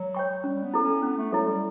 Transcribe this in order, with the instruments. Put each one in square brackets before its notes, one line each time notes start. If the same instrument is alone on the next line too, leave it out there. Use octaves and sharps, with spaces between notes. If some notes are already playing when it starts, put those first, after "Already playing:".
Already playing: [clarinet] F#3
[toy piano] C#5 G5 C#6
[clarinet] G3 [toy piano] C#4
[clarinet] B3
[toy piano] E4 A4
[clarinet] C#4
[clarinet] B3 [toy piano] C#4
[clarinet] A3
[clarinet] F#3 [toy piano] E4 A4
[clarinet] G3